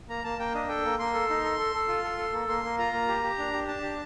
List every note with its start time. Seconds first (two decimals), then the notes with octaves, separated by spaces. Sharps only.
0.09 A#3 A#5
0.24 A#3 A5
0.39 A#3 G5
0.54 D4 D#5
0.69 A4 G5
0.85 A#3
0.99 A#3 C6
1.14 A4
1.29 D#4
1.44 A4
1.59 A4
1.74 A4
1.88 F4
2.04 A4
2.18 A4
2.33 A#3
2.48 A#3 C6
2.64 A#3
2.78 F4 A#5
2.93 A#3
3.08 G4
3.24 G4
3.38 D4
3.53 G4
3.68 D4 A5
3.82 G4